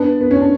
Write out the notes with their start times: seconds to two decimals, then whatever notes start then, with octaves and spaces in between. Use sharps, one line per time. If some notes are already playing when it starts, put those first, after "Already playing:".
Already playing: B3 D4
0.21 B3
0.31 C#4
0.40 D4